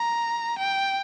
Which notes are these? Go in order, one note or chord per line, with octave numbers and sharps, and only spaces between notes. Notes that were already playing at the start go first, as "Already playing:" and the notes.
Already playing: A#5
G5